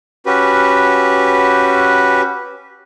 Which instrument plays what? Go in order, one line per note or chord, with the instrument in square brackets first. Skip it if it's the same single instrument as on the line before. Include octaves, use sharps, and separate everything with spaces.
[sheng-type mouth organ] C#4 F#4 G4 B4